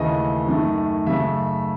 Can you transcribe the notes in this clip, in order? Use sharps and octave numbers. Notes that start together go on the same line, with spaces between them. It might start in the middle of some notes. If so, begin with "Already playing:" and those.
Already playing: D#2 C#3 E3 A3 D#5
F#2 D#3 A3
F#2 C#3 F#3 A3 E5